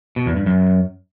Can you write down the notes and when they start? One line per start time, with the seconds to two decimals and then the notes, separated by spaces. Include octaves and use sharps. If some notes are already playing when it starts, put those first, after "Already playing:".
0.16 B2
0.26 E2
0.36 G2
0.46 F#2